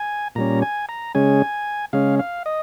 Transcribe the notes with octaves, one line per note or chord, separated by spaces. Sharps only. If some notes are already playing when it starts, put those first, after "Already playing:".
Already playing: G#5
A#2 G3 C#4 A#5
G#5
A#5
C#3 G#3 C#4 G#5
C#3 G#3 C#4 F5
F5
D#5